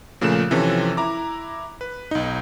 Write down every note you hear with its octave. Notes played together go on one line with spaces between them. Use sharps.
A#2 C#3 F3 A3 F#6 E7
C3 E3 F3 C4 C#4 A4
E4 A#5 D6
B4
B1 D#4